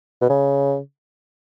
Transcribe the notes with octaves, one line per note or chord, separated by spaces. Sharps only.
B2
C#3